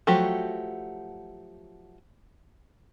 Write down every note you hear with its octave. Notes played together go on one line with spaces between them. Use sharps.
F3 F#3 A3 F#4 G4